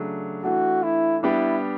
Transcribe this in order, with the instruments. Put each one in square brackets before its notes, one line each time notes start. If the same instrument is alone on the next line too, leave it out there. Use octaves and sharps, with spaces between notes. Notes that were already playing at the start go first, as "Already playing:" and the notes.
Already playing: [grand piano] C#3 F#3 A3 D4
[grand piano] E3 A3 D4 [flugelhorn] F#4
[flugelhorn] E4
[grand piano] G3 B3 D4 G4 [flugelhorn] E4